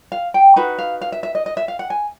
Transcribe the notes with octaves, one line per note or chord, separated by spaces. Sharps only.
F5
G5
D#4 F#4 B4 F#5
F5
F5
E5
E5
D#5
D#5
E5
F5
F#5
G#5